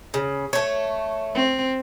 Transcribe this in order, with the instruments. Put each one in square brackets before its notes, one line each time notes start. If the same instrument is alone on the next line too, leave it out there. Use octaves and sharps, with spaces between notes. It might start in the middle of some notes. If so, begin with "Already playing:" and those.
[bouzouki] C#3
A3 C#5
[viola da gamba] C4